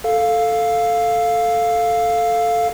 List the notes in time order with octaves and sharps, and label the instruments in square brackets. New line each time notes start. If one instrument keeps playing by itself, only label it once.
[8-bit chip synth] A4 F5